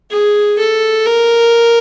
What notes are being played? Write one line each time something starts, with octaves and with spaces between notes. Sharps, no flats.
G#4
A4
A#4